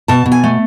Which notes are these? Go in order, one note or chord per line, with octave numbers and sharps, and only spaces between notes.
B2 A5
B2
G#5
A3